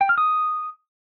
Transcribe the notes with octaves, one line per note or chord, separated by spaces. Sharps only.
G5
F6
D#6